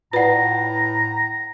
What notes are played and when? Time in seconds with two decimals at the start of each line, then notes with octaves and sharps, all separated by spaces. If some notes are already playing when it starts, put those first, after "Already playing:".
0.13 A2 F4 B4 D5 F#5 A#5